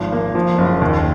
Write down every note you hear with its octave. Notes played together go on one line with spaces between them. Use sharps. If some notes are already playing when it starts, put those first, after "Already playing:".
Already playing: G#1 F3
A#3
F3
F#1
D#2